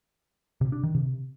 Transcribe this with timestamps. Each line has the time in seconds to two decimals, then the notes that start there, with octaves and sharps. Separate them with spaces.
0.61 C3
0.72 D4
0.83 D#3
0.95 C3